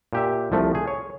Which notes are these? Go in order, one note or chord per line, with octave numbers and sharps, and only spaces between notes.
A#2 G4 E5
C2 F3 A3
G#4
C#5